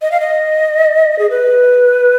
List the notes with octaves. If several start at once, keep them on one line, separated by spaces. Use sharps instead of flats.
D#5
F5
D#5
G#4
B4